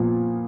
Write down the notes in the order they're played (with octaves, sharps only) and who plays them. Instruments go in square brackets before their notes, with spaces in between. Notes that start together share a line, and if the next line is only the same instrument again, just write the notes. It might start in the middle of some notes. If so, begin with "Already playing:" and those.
Already playing: [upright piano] A#2 F3 B3 F4